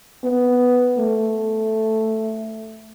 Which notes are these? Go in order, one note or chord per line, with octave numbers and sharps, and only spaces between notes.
B3
A3